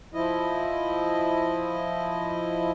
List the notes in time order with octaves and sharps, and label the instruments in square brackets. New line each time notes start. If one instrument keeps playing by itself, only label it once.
[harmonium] F3 E4 D#5